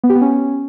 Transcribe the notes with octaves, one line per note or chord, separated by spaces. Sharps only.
B3
G4
B3
C#4